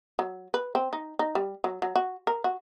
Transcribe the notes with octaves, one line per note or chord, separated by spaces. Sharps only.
F#3
B4
C4
D#4
D#4
G3
F#3
F#3
F#4
A#4
F#4